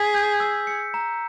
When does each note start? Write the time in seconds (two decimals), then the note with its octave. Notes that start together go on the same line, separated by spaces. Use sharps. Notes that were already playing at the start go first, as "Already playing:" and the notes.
Already playing: G#4 B6
0.14 G6
0.40 E6
0.67 C#7
0.94 A#5